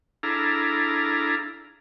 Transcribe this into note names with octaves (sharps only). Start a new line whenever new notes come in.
D4 E4 G#4 A4 F5 A#5